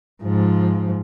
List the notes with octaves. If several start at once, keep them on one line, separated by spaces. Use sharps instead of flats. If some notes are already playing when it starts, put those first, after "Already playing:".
G#2 F3